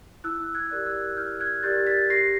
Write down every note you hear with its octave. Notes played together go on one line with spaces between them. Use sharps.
E4 E6 F#6
F#6 G#6
G4 A#4 D5
E6 F#6
E4 F6 G6
F#6 G#6
G4 A#4 D5 G6 A6
A6 B6
G4 A#6 C7